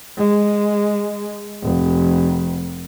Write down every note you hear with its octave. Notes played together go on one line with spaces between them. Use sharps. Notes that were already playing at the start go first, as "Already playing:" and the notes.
G#3
F1